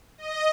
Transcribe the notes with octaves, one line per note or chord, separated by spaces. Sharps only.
D#5